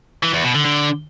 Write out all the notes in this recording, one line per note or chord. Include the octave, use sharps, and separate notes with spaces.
E3
E2
B2
D3
D3